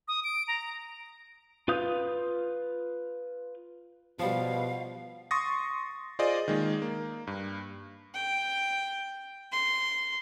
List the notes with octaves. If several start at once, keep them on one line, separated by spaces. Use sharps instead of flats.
D#6
D7
A#5
F4 B4 F5 D#6 G6
B2 F3 G3 F5
C6 C#6 D#6 A6 A#6
F4 G#4 C5 D5 D#5
D#3 G#3 A#3
A#3
G2
G5
C6